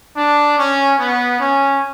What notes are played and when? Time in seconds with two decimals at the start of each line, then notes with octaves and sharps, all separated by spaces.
0.17 D4
0.58 C#4
0.98 B3
1.40 C#4